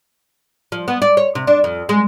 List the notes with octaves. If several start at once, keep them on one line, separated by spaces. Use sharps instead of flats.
F3
B3
D5
C#5
C3
D4
F2
G#3